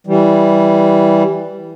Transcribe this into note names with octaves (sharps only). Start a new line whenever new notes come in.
E3 G3